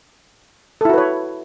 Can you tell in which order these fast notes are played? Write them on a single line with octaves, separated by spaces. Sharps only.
A4 E4 F#4 B4 C#5